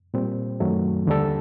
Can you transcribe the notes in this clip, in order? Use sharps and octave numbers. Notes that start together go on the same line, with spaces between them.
A#2 G3 C4
F#2 D#3 F#3 A3
D#2 D3 G3 D4 A4